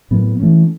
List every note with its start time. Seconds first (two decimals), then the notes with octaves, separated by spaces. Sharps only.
0.11 A2 F#3 B3
0.40 E3 A3 C#4